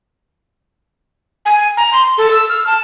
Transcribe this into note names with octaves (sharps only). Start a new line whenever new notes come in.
G#5
A#5
C6
A4
E6
F6
A5